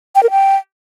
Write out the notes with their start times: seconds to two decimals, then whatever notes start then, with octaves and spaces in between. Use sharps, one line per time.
0.15 G5
0.23 A#4
0.31 G5